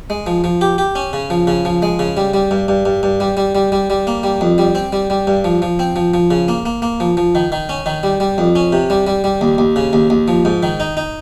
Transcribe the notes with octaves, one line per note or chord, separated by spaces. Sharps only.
G#3
F3
F3
G4
G4
C#4
C#3
F3
C#3
F3
G#3
C#3
G3
G3
G2
G2
G2
G2
G3
G3
G3
G3
G3
A#3
G3
F2
G3
C4
G3
G3
G2
F3
F3
C4
F3
F3
C#3
A#3
A#3
A#3
F3
F3
D#3
D#3
C#4
D#3
G3
G3
F2
C#4
C3
G3
G3
G3
D#2
D#2
C#3
D#2
D#2
F3
G#2
D#3
D#4
D#4